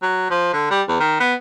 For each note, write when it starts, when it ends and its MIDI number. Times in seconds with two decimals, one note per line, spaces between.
0.03 0.27 54
0.30 0.48 53
0.53 0.67 50
0.71 0.82 55
0.88 0.98 40
1.00 1.17 51
1.20 1.34 59